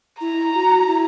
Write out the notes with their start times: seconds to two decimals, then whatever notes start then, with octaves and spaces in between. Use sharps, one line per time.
0.21 E4 A#5
0.54 F#4
0.86 E4